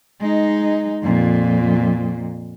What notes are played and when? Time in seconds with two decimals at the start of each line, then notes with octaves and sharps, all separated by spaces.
0.20 G#3 D#4
1.02 F2 A#2